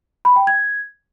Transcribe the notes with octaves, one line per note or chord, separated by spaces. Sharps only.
B5
G5
G#6